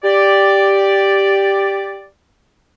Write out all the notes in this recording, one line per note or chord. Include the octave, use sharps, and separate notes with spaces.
G4 D5